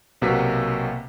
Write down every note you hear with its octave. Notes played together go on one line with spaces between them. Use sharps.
B1 C3 A#3 F#4 B4 B6